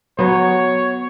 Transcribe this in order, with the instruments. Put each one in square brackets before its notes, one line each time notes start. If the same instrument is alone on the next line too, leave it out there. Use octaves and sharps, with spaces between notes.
[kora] F#3 B3 [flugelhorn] C#5